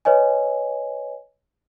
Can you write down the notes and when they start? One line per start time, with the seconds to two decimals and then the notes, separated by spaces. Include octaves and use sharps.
0.05 B4 C#5 D#5 G#5